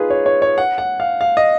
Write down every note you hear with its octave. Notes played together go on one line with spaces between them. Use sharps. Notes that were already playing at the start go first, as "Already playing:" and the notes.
Already playing: D#4 F4 G#4 B4
C#5
C#5
C#5
F#5
F#5
F5
F5
D#5